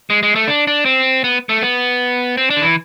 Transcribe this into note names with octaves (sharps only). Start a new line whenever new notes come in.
G#3
G#3
A3
D4
D4
C4
B3
A3
B3
C4
D4
D3
E3